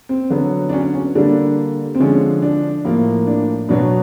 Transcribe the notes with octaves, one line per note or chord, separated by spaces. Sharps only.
C4
D3 F#3 B3
D4
C#4
C#4
D3 G3 A#3 D4
C4
D3 F3 G#3 C#4
D4
A2 F3 A#3
D4
B2 F#3 B3 D4